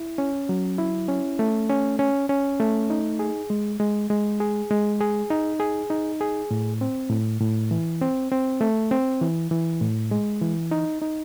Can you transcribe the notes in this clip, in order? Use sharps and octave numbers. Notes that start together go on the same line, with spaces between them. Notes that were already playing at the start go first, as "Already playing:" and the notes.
Already playing: E4
C#4
F#3
E4
C#4
A3
C#4
C#4
C#4
A3
D#4
G#4
G#3
G#3
G#3
G#4
G#3
G#4
D#4
G#4
D#4
G#4
A2
C4
A2
A2
E3
C4
C4
A3
C4
E3
E3
A2
G#3
E3
D#4
D#4